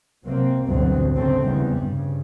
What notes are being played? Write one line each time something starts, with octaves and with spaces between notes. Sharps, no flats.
C3 F#3 A#3 C4
A1 D2 G2 B2 F#3 C4
F1 C#3 A3 C4
E2 C#3 G3
G2 C#3